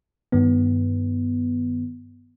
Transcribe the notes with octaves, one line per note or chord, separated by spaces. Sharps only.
G2 D#3 B3